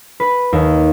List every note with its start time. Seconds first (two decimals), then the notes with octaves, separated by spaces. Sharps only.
0.20 B4
0.53 D#2